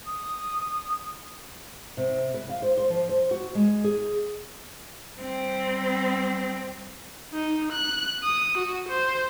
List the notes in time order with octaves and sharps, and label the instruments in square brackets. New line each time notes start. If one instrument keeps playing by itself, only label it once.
[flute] D#6
[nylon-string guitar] C3
B4
F5
C5
C5
F3
C5
F#4
G#3
G#4
[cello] G3 C4
[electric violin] D#4
F#6
D#6
F#4
C5